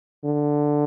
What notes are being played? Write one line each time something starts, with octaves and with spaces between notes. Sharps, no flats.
D3